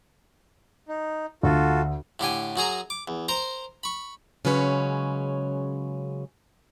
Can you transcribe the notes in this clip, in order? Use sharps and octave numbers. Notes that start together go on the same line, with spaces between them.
D#4
D2 F4 F#4 A4
A2 D3 G4 G#5
F#2 F#4 G#4 A#5
D6
E2
A#4 C5 A#5
B5 C#6
C#3 F#3 G#3 C#4 B4 C#5